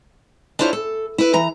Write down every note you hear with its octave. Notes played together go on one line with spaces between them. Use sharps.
D4 E4 F4 C5 C#5
A4
E4 B4
E3 A#5